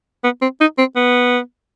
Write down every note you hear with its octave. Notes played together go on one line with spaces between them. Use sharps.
B3
C4
D#4
C4
B3